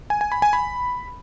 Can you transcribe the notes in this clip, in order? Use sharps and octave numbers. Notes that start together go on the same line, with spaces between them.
G#5
G#5
B5
G#5
B5